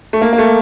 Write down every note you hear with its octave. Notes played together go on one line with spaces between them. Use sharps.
A3
A#3
A#3
A3